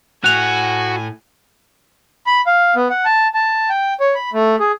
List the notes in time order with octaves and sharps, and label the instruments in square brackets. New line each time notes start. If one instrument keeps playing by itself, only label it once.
[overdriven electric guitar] A2 [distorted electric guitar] F#4 [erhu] G#5 [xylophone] F#6 F7
[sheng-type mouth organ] B5
F5
B3
F#5
A5
A5
G5
C#5
B5
A3
G#4